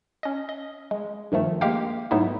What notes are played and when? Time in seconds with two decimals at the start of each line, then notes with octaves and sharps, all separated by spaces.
0.23 C#4 D#5
0.49 D#5
0.91 G#3
1.32 G2 D#3 F3 A3
1.61 G#3 A#3 G4 F5 G5
2.11 G#2 F#3 A3 B3 D#4 E4